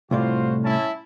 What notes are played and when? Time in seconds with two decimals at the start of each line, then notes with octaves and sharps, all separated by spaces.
0.11 C2 A2 F4 F#4 C5 D5
0.64 C#4 E4 A5